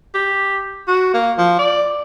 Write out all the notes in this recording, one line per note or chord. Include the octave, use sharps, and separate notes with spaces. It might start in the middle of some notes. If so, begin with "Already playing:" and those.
G4
F#4
A#3
F3
D5